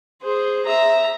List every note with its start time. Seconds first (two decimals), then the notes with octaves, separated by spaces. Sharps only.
0.23 G#4 C5
0.66 E5 A#5